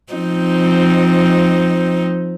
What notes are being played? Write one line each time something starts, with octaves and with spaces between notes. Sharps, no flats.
F3 C4 D#4